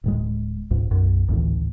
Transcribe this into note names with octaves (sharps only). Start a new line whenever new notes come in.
D1 A2 G#3
C#2 G#2
B1 F#2
G#1 D2 A2 E3